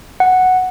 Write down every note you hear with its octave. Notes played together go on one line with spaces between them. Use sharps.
F#5